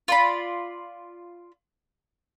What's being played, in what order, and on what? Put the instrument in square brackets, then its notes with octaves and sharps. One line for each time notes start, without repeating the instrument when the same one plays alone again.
[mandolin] F4 D5 B5